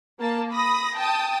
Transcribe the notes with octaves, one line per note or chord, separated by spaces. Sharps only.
A#3 A5
B5 D#6 A#6
G5 A5 D#6